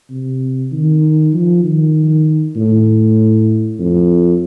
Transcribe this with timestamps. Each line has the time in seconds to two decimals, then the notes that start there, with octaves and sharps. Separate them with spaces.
0.10 C3
0.72 D#3
1.33 F3
1.64 D#3
2.56 A2
3.79 F2